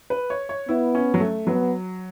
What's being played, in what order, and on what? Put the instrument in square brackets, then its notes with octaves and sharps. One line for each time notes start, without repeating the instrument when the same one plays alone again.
[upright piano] B4
C#5
C#5
[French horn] B3 [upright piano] E4
[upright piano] C#4
F#3
A3
[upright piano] F#3 [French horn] B3